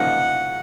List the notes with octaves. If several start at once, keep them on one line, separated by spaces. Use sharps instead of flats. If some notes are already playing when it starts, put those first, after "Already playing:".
Already playing: C#3 F3 A#3 D#4 F#5